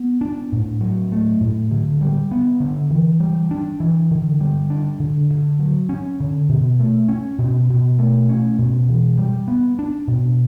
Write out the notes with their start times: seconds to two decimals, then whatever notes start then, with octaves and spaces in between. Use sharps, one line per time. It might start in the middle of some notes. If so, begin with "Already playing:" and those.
Already playing: B3
0.21 D4
0.52 A2
0.81 F#3
1.12 A3
1.40 A2
1.71 D3
2.01 G3
2.31 B3
2.60 D3
2.90 E3
3.20 G3
3.51 D4
3.80 E3
4.11 D3
4.41 G3
4.70 D4
5.00 D3
5.30 D3
5.59 F#3
5.89 C#4
6.20 D3
6.49 B2
6.79 A3
7.08 C#4
7.38 B2
7.69 B2
7.99 A3
8.29 C#4
8.58 B2
8.89 E3
9.18 G3
9.48 B3
9.79 D4
10.07 B2